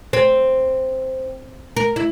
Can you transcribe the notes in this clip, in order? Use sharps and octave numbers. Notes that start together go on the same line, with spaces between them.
C4
A#4
E4